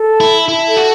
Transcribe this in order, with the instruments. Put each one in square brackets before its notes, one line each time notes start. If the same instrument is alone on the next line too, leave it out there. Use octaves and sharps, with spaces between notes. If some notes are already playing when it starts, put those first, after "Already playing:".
Already playing: [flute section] A4
A5
[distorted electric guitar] E4
[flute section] A5
[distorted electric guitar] E4 [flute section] A5
[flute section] A4
[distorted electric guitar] F#4